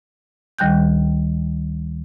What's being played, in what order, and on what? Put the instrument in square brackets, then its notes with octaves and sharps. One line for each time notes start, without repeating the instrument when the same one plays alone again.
[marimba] D2 D#3 G3 G5 F#6 G6